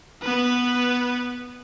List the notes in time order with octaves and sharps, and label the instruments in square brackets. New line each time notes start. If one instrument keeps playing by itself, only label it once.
[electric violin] B3 B4